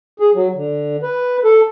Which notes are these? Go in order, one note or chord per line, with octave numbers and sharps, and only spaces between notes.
G#4
F#3
D3
B4
A4